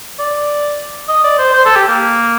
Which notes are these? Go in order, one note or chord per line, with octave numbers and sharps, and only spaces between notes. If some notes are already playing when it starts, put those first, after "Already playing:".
D5
D#5
D5
C5
C5
A4
G4
A#3